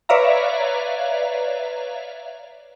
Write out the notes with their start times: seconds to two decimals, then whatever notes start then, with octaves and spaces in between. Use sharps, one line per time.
0.09 B4 C#5 D5 E5 F5 A#5